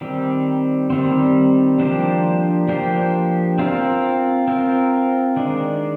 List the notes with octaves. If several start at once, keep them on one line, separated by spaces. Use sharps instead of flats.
D#3 G3 C4
D#3 G3 C4
F3 A#3 D4 G4 C5
F3 A#3 D4 G4 C5
C4 F4 A#4
C4 F4 A#4
D#3 G#3 D4